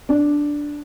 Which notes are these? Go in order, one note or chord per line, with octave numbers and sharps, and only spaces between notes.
D4